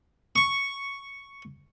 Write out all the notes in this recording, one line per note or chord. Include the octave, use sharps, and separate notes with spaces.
C#6